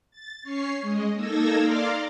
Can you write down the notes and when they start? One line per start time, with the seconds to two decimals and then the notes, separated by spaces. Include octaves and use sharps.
0.11 A6
0.43 C#4 C#5 C#6 C7
0.82 G#3 D#5
1.15 A#3 D#4 A4 E6 G#6 A#6
1.59 D5 F5 A#5 C6 D6 F6